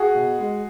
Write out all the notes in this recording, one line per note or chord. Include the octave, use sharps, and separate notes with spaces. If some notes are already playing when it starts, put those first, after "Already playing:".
Already playing: F#4 G#4
B2
G#3